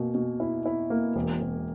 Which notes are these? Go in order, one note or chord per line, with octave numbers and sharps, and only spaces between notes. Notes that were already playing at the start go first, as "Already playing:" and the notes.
Already playing: B2 A#3
B2
E4
E4
A#3
E1
E1